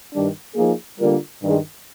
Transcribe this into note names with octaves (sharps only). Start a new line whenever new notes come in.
G2 D#3 G3 D4
F3 A#3 D#4 G#4
D3 G3 A#3 F4 A#4
G2 D#3 G#3